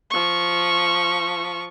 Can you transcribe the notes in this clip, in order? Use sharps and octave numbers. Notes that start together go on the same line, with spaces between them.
F3 C#6